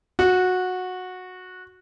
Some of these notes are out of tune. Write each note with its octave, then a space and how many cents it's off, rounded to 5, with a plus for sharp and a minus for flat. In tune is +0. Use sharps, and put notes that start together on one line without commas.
F#4 -15